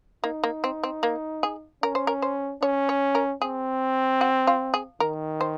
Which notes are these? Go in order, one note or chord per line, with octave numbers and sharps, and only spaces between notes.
A#3 D#4
A#3
C4
C4
A#3
G#4
C#4 A#4
C5
A#4
C5
C#4 C#5
C#5
A#4
C4 G#4
F#4
F4
G#4
D#3 A#4
C5